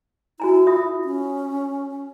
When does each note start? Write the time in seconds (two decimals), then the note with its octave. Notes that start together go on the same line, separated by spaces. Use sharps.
0.40 E4 F#4 G#5 A#5
0.67 F4 E5 D#6
1.05 C#4